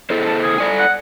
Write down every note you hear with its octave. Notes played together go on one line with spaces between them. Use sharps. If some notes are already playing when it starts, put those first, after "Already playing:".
E4 A4 C5
A5
G#4
A4 D5 G#5
F#5